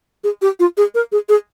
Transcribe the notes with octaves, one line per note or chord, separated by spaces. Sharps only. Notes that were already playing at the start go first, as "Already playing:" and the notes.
G#4
G4
F4
G#4
A#4
G#4
G#4